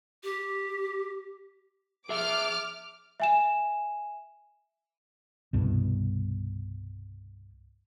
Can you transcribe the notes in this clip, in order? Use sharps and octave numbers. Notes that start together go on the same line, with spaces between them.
G4
G#4 E5 D6 F6
E5 G#5 E7
C2 G2 B2